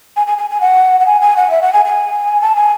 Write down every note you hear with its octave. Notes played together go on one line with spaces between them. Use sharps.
G#5
G#5
G#5
G#5
F#5
F#5
G#5
G#5
F#5
E5
F#5
G#5
G#5
A5
G#5